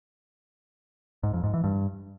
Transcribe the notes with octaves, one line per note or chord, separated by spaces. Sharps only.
G#2
F2
G#2
E3
G2